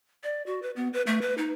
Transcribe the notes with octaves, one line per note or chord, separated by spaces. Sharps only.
D5
F#4
B4
B3
B4
A3
B4
D#4